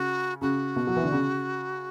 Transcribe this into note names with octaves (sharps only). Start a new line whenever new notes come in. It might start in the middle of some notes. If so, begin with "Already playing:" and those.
Already playing: C#3 F#4
C#3 F#4
B2
F#3
E3
D3
C#3